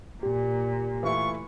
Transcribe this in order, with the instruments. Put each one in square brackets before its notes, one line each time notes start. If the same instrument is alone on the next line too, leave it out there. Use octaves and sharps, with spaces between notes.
[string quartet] A#2 [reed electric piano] G4
[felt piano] E3 A3 E4 [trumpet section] F4 C#6